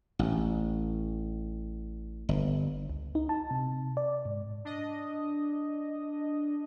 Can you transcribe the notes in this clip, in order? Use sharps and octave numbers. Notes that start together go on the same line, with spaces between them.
A1
G1
C#2
D#4
A5
C3
D5
G#2
D4 D#5